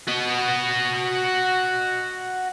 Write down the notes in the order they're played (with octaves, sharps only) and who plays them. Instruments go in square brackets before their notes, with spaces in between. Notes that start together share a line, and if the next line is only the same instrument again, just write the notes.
[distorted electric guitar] F#4 D#5